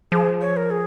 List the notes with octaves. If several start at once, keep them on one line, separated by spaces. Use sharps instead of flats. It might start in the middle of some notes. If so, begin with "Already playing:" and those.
F3 G#4
C#5
A#4
G#4